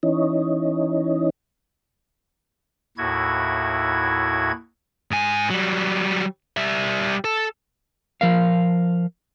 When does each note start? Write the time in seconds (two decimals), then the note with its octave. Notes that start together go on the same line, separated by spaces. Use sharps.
0.03 E3 C#4 D#4
2.97 D#2 A2 E4 F#4 G#6
5.11 G#2 G#5
5.50 F#3 G3
6.57 G3 E5
7.24 A4
8.21 F3 A#4 F5